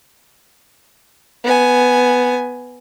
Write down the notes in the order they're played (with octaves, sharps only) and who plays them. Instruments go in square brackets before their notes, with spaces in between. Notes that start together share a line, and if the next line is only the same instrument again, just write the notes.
[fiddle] B3 G#5